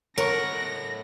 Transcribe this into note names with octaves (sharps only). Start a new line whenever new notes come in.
A2 A#4 C#5 F#5 C#6 A#6